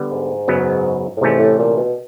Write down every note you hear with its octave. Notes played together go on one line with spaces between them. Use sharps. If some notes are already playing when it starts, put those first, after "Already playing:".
Already playing: D3 G3 B3
G#2
F#2 C#3 F#3 B3
A2
G#2 C3 E3 A3 C#4
A2
A#2
B2